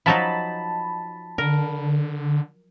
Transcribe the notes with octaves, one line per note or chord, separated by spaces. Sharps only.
F3 F#3 D#4 A5 B5
D3 A#4